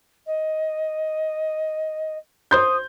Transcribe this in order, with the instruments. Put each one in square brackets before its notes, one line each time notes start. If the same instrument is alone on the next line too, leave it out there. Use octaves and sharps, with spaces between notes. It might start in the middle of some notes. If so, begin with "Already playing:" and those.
[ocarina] D#5
[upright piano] C5 C6 G6 [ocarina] D#6